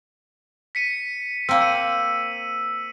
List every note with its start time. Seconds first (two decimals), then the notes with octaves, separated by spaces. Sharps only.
0.75 B6 C#7 D#7
1.49 A#3 C4 E6
1.60 C#7 D#7